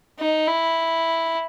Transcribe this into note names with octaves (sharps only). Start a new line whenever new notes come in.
D#4
E4